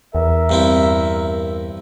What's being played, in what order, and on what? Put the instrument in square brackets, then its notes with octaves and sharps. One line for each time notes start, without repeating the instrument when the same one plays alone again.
[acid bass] E2 [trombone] A#4 [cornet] E5
[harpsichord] G2 C4 E4